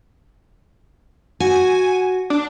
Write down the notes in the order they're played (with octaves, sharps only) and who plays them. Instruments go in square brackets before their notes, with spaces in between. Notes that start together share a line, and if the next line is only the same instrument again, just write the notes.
[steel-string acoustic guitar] F#4 [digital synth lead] G#5
[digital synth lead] D4